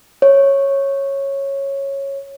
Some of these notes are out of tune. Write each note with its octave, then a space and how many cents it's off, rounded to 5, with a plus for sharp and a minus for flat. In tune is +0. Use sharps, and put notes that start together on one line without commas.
C#5 -10